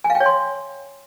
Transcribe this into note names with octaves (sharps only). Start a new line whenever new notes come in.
G#5
F5
G5
C#5
C6